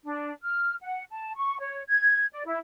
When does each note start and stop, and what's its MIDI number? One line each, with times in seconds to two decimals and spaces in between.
0.05 0.31 62
0.42 0.75 89
0.82 1.04 78
1.10 1.32 81
1.36 1.57 85
1.60 1.82 73
1.88 2.26 92
2.33 2.43 74
2.45 2.58 64